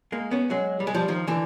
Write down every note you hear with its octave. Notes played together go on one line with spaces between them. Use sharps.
G#3 A#3
B3 C#4
F#3 G#3
G3
G#3
F3 G3
D#3 F3
D3 E3